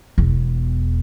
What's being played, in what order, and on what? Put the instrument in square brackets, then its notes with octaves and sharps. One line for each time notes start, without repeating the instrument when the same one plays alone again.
[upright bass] E1 E2